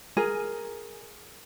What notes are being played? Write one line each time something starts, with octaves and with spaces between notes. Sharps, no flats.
G#4 A#4 G#5